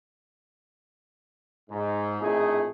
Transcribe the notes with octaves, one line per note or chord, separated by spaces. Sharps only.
G#2
A#1 F2 A2 A3 D#4 G#4